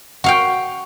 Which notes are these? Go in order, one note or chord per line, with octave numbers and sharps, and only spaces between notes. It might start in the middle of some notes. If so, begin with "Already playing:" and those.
F#4 F5 G5